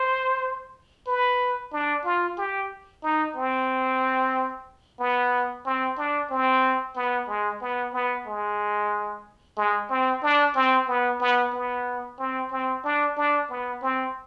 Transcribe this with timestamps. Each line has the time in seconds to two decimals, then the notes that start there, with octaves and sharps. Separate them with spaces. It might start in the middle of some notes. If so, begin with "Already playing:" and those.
Already playing: C5
1.07 B4
1.72 D4
2.05 F4
2.38 G4
3.03 D#4
3.36 C4
5.00 B3
5.65 C4
5.97 D4
6.30 C4
6.96 B3
7.28 G#3
7.61 B3
7.93 B3
8.27 G#3
9.57 G#3
9.90 C4
10.23 D4
10.55 C4
10.88 B3
11.20 B3
11.53 B3
12.19 C4
12.51 C4
12.84 D4
13.17 D4
13.49 B3
13.82 C4